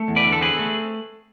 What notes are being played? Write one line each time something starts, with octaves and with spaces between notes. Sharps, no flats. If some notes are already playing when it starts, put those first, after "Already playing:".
Already playing: A3
E2
B4 D5
D3
A4
C4 G#4 B4
A3